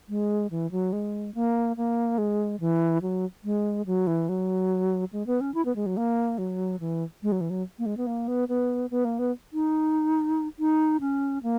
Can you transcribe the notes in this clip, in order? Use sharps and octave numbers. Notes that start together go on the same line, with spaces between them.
G#3
E3
F#3
G#3
A#3
A#3
G#3
E3
F#3
G#3
F#3
E3
F#3
G#3
B3
C#4
E4
B3
G#3
F#3
A#3
F#3
E3
G#3
F#3
E3
F#3
A#3
G#3
B3
A#3
B3
B3
B3
A#3
B3
D#4
D#4
C#4
A#3